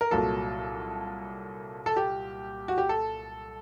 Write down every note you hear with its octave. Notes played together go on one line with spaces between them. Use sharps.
A#4
C2 A#2 F#3 A#3 A4
A4
G4
F#4
G4
A4